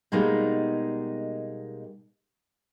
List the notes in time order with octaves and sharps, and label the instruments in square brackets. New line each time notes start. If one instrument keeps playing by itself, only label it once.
[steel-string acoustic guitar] B2 G3 G#3 A#3 D#4